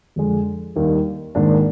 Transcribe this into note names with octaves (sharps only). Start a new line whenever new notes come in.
F2 D3 G#3
D#2 D#3 G3
G#2 D#3 A#3 D4